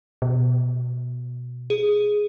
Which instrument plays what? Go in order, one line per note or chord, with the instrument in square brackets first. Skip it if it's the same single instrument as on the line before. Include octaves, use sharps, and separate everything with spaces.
[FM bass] B2
[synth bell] G#4